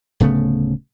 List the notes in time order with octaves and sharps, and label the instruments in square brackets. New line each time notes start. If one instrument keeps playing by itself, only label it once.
[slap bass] D1 C#3 A3 B3